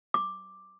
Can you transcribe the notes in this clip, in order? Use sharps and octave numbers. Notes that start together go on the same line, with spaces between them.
D6